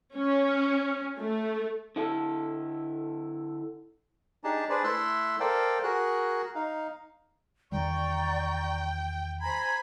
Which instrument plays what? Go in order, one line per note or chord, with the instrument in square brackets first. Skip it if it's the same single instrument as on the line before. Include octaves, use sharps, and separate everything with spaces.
[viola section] C#4
A3
[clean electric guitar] D3 E4 A4
[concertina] D4 D#4 G4 G#4 A5
D4 G#4 B4 C5 D5
A3 E4 E5 C6 E6 F#6
A4 A#4 C5 D5 F5 G5
F#4 G#4 A#4 F#6
D#4 F5
[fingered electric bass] E2 D#3 G3 [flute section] D5 A#5 C#6 [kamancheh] G5
[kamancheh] C5 B5 [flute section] G#5 A#5 G#6